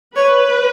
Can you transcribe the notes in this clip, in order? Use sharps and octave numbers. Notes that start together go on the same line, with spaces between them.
B4 C#5